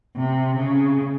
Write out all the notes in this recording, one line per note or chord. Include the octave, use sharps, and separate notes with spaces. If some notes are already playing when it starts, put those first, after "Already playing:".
C3
C#3